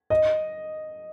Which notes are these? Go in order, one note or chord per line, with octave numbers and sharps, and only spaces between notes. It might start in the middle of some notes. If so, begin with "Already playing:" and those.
D#5